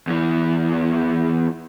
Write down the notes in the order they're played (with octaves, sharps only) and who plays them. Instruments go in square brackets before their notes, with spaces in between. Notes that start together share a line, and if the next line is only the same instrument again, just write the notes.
[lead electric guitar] E2 E3